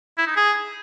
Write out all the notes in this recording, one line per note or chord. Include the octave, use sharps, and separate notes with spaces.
E4
D#4
G#4